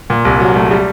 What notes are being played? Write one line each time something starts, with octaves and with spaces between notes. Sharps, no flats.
A#2
C2
F#3
A3
G3